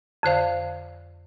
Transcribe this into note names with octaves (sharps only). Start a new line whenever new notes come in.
F2 D3 C5 F5